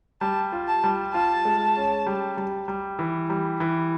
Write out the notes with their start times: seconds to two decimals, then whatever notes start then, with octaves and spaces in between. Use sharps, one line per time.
0.21 G3 A5
0.52 F4
0.68 A5
0.84 G3
1.14 F4 A5
1.45 G#3
1.76 C#4
2.07 G3
2.37 G3
2.68 G3
2.99 E3
3.30 G3
3.60 E3